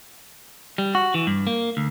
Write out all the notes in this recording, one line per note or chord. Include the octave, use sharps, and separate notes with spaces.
G3
F#4
E3
G2
A#3
D2